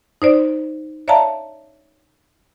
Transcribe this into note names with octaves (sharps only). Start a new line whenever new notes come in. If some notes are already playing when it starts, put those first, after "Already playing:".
D#4 C5 D5
C#5 D5 E5 F5 A5 A#5